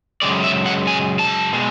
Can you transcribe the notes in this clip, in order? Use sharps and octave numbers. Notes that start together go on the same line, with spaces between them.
F#2 C#3 G#3 D5
E5
F#5
G#5
A5
B2 G#3